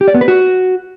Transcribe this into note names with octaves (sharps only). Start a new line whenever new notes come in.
G4
D5
B3
B4
F#4